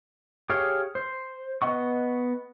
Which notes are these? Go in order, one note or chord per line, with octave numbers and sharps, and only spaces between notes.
G4 G#4 C#5 F5
C5
B3 D#5 F#5 C#6